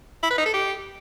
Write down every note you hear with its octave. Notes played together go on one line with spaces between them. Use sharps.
E4
B4
D#4
A4
G4